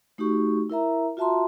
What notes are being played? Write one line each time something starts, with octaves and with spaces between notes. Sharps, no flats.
A3 D#4 F#4 G4 C#6
E4 A#4 E5 A#5
F4 F#4 E5 A5 A#5 C6